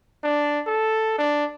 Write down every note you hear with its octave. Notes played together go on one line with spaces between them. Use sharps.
D4
A4
D4